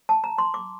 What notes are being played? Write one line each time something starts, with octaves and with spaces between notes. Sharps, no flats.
A5
A#5
C6
D6